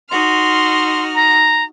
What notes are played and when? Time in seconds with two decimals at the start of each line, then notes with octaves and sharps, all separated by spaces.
0.10 D#4 F#4 C6 F6
1.14 A#5